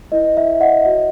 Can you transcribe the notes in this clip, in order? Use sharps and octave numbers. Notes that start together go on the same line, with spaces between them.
E4 B4 D#5
E5
D#5 F#5
F#4 C#5 D#5